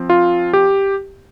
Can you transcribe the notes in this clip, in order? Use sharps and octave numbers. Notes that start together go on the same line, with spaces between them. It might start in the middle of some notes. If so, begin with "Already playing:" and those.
Already playing: F3 C4
F4
G4